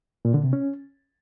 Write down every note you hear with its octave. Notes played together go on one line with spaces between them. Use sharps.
A#2
D3
C3
C#4